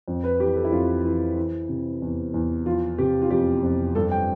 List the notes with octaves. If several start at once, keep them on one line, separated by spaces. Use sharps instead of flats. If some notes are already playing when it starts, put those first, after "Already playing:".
F2
B4
E3 G4
A4
E4
F2 F4
E3
E3
C3
E2
E2
F3 F4
C3 G4
F4
F2 G4
F2
G2 A4
G5